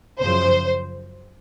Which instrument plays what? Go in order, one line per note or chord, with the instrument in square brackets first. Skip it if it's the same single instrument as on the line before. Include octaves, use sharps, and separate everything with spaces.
[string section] F#2 C#3 F3 C5